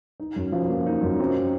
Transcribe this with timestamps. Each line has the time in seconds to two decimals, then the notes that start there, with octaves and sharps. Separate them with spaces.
0.20 D#4
0.36 F#2
0.52 F3
0.69 A#3
0.86 D#4
1.02 F#2
1.19 C4